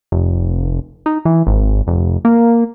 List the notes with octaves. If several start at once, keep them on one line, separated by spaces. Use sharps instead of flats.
F1
D#4
E3
G#1
F1
A#3